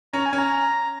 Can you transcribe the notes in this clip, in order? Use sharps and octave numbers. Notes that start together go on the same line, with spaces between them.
C#4 A#5
G#5
C#4
A#5